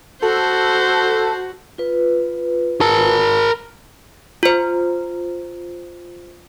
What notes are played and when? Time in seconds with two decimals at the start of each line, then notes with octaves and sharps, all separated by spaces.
0.22 F#4 A4 C5
1.78 F4 B4
2.81 A#4 A5
4.43 F4 C5